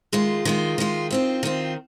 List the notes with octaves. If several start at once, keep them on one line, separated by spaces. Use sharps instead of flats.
D#3 G#3 F4
D#3 G#3 F4
D#3 G#3 F4
D#3 C4 F4
D#3 C4 F4